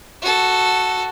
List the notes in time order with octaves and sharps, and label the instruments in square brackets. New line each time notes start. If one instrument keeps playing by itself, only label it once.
[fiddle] F#4 A4